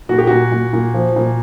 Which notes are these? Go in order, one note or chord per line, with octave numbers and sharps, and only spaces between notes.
A#2 F#4
G4
A#2 F#4
A#2
A#2
F3
A#2